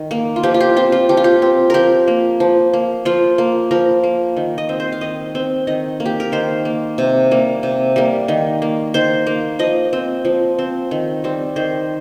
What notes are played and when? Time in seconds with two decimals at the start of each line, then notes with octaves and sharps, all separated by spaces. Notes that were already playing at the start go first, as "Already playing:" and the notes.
Already playing: D#3
0.11 A#3
0.36 F4
0.43 F3 G4
0.54 F4
0.60 G4
0.76 C4 F4
0.92 F4
1.09 F3 G4
1.17 F4
1.24 G4
1.42 C4
1.70 F3 G4 A#4
2.07 A#3
2.40 F3
2.73 A#3
3.05 F3 F4
3.38 A#3
3.71 F3 A#4
4.04 A#3
4.37 D#3
4.58 D#5
4.69 C4
4.80 C5
4.92 F5
5.01 D#3 D#5
5.35 C4
5.67 D#3 D#5
6.00 A#3
6.06 G4
6.20 A#4
6.32 D#3 C5
6.65 A#3
6.98 C3
7.31 G3 A#3
7.63 C3
7.96 G3 A#3
8.28 D#3
8.62 A#3
8.94 D#3 C5
9.27 A#3
9.59 F3 D#5
9.93 C4
10.25 F3
10.59 C4
10.91 D#3
11.24 G3 C4
11.56 D#3 C5